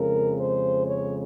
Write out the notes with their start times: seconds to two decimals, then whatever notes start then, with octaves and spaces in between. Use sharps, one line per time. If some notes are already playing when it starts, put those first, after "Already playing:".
Already playing: F2 C#3 G#3 A#4
0.39 C5
0.86 C#5